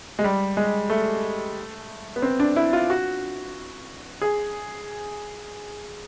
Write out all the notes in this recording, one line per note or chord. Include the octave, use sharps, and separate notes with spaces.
G#3
G3
G#3
A3
B3
C4
D4
E4
F4
F#4
G#4